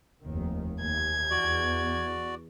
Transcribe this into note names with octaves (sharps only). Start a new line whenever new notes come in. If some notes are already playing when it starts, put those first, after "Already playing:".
F1 D#2 D#3
D#2 G#6
E2 F#4 D5